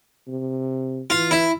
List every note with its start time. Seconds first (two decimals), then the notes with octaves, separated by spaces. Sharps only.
0.28 C3
1.10 E3 F4
1.31 E4